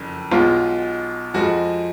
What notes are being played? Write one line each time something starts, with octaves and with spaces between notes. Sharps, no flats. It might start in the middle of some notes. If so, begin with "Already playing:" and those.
Already playing: F#1 F2 C#3
B1 B2 G#3 F4
F2 F3 G#3 F#4